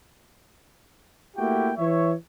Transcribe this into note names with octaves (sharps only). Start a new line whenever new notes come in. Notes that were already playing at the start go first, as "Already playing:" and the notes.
A3 A#3 E4 F#4 G4 G5
E3 C#5 E5